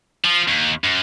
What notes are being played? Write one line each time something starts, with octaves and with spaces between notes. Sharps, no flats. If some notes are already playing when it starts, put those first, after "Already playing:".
F3
D#2
F#2